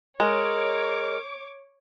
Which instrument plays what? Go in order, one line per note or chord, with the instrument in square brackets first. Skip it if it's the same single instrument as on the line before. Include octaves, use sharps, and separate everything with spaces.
[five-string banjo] G#3 [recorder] A#4 [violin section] C#5 D6